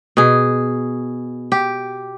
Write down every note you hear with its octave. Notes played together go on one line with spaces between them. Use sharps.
B2 G#4
G4